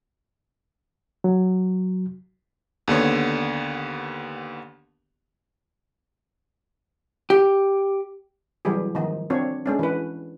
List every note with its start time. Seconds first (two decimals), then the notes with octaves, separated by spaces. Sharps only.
1.24 F#3
2.88 D#2 D3 B3 C#5
7.30 G4
8.65 E3 F#3 G3 G4 G#4
8.95 D#3 F3 D#4
9.30 C4 D4 F4 C#5
9.66 G#3 C#4 D4
9.79 E3 B4